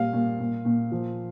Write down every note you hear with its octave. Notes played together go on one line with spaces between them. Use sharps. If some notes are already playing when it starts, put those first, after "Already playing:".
Already playing: A#2 G3 F5
A#2
A#2
A#2
F3